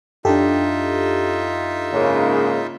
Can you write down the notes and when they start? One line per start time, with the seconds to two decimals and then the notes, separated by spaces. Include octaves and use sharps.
0.25 F#2 D4 D#4 F4 G4 A4 E5
1.93 G#2 C#3 A#3